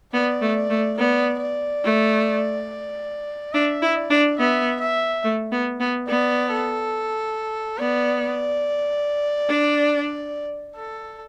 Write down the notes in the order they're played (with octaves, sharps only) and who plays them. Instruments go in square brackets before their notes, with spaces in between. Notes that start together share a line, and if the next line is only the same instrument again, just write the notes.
[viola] B3 [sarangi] D5
[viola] A3
[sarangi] D5
[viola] A3
[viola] B3 [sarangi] D5
[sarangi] D5
[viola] A3
[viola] D4 [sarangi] E5
[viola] E4
[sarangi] D5
[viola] D4
[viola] B3 [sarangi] E5
[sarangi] E5
[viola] A3
B3
B3
[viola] B3 [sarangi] D5
[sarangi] A4
[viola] B3 [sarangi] D5
[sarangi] D5
[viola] D4
[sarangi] A4